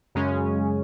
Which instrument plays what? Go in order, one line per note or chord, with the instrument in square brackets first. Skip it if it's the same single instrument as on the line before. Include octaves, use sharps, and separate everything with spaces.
[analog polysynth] F#2 C#3 G#3 C#4